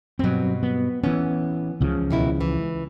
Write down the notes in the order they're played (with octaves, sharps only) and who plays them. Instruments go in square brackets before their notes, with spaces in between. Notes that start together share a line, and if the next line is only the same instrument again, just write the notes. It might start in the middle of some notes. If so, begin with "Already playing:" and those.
[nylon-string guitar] G2 B2 [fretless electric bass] F#3 C4
[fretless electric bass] B3
[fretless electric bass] E3 C#4 [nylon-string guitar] B3
[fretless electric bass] C#2 C#3 F3
[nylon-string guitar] D#2 B2 E4
E3